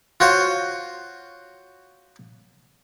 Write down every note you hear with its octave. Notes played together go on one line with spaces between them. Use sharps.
F4 F#4 C5 C#5